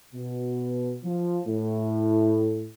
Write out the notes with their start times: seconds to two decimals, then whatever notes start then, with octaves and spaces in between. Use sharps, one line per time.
0.13 B2
1.04 F3
1.47 A2